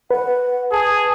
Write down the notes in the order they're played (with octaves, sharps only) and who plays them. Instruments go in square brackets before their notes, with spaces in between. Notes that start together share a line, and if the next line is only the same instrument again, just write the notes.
[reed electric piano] B4 [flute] F#5
[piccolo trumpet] G#4 [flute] A5